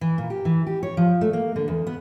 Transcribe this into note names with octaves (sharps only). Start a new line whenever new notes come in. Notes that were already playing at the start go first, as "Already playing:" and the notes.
E3
A#2
G4
E3
G4
C#5
F3
A3
A#3
D3
E2
B3